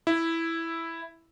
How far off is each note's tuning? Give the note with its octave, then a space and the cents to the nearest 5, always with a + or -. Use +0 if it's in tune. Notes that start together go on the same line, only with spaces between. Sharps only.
E4 +0